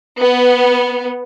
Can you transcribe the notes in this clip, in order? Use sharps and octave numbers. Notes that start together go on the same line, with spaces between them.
B3